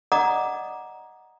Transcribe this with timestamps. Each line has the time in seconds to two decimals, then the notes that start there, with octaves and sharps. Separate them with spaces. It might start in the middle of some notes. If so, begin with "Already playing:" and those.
0.12 D5 D#5 F#5 A#5 D6 D#6